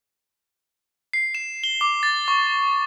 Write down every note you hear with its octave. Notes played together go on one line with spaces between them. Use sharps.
C7
E7
G7
D6
A6
C#6